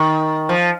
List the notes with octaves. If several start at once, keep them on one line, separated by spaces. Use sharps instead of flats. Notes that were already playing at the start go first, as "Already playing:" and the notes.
Already playing: D#3
F3